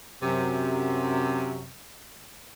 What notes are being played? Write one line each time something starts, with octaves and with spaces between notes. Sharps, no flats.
F#2 C3